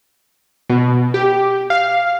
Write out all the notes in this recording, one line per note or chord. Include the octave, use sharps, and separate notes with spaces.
B2
G4
F5